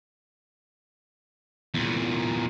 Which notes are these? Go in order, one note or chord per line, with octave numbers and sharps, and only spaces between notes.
E2 A#2